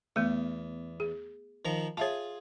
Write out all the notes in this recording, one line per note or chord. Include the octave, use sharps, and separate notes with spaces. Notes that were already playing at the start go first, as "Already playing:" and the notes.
E2 A3 B3
G#4
D#3 F3 A#5
F4 G#4 C#5 E5 A5